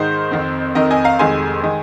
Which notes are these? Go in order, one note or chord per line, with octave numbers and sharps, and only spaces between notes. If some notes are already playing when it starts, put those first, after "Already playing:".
Already playing: G#2 D#3 G#3 D#4 C5
F2 D#3 C4
F2 D#3 C4 A#4 D#5
D#5 G#5
F5 A#5
F1 F2 D#3 G#3 G#5 C6
D#3 G#3